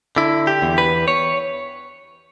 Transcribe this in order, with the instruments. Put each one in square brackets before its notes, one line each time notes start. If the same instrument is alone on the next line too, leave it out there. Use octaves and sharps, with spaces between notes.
[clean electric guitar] D3 E4
G4
E2
B4
C#5